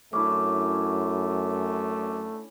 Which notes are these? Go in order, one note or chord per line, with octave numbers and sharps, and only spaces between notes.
F#2 A3 C#4 D4 E4 D6